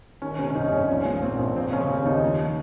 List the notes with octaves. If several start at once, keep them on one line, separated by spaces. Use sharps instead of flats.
D#3 C#4
C3 C#4
C#4
C2 D#4
C2 C#4
F3 C#4
A#2
A#1 C4
A#1
F3 C4
C#3 C#4
D#2 C4
D#2 D#4
F3